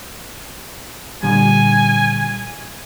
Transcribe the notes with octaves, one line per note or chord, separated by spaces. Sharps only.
A#2 D3 G3 G#5